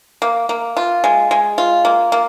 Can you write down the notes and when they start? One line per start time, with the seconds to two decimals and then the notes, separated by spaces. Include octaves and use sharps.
0.22 A#3
0.49 A#3
0.77 F4
1.04 G#3
1.31 G#3
1.58 F4
1.85 A#3
2.12 A#3